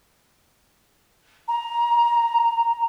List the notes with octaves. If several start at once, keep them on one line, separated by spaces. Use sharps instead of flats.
A#5